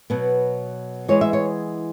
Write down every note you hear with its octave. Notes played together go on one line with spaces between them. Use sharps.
B2 F#3 B3
E3 G#3 B3 C#5
E5
C#5